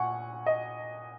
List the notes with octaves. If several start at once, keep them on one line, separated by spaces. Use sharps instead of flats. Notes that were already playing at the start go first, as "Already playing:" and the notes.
Already playing: A#2 F#5 G#5 C#6
D#5